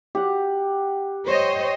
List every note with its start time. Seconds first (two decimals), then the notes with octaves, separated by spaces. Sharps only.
0.15 G4 F#5
1.26 C5 C#5 D#5